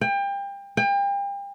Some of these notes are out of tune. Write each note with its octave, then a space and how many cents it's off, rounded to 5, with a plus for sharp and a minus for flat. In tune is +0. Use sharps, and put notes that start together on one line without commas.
G5 +30
G5 +35